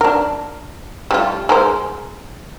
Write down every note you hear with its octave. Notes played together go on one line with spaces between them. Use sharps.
D4 A#4
G3 A3 F4
G#3 A#4 C5